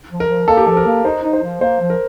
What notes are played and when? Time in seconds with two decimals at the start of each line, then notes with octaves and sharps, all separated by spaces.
0.10 F3
0.20 A#4
0.29 F3
0.48 A#3 A4
0.57 G4
0.66 F3 A4
0.77 A#4
0.86 A#3
1.05 D#4 C5
1.24 D#4
1.33 C5
1.42 F3
1.61 A#3 C5
1.80 F3
1.90 A#4